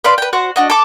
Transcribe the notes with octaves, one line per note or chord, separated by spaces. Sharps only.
B4 D5 F5 C6
B4 G5
F#4 C5 F#5
D4 F#4 D#5
A4 D6